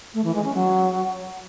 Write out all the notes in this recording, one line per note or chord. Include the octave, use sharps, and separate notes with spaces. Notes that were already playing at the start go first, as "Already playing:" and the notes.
A3
E3
G#3
C#4
F#3